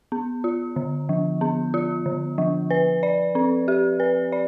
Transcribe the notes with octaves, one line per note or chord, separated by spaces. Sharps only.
B3
F4
D3
F3
B3
F4
D3
F3
B4
D5
C4
G4
B4
D5